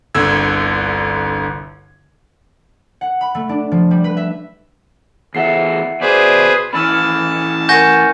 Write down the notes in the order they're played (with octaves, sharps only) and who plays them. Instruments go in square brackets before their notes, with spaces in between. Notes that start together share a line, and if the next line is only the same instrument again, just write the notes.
[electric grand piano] G1 C2 D3 E6 G#6
[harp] F#5
B5
A3
D4
F3
G3
B4
E5
[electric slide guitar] E2 A4 [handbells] E5 F#5 C7
[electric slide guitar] B2 D5 [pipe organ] G#4 B4 C5
[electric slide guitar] E3 C#4 [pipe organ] A5 [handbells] B5 E6 F6
[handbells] A#4 F#5 G#5 [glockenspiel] C#6 G6 A#6